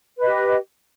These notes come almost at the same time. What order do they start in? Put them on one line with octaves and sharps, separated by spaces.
B4 D#5 G4